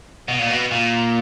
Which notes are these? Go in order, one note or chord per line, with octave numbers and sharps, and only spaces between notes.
B2
A#2
B2
A#2